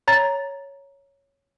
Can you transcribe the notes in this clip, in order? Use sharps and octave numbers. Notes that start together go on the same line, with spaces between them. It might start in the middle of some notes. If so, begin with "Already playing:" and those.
C#5 A#5 A6